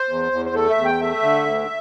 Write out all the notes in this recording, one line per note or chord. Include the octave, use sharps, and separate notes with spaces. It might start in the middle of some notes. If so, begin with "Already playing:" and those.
Already playing: C5
E2
E2
C5
A3 A4
E5
E2
G5
A3 E5
D3
D2